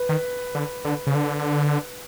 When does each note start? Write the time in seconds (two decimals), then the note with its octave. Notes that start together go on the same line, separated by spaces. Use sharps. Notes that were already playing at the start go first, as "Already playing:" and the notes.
Already playing: B4
0.09 D#3
0.55 D3
0.85 D3
1.07 C#3
1.15 D3